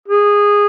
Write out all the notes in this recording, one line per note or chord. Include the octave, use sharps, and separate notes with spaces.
G#4